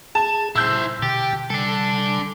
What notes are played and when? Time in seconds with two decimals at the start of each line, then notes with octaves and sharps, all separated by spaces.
0.15 G#4 A5
0.56 A#2 E4 C5 E6 G6
1.03 B2 D3 G4 A5
1.50 C3 G3 D4 A4 G#5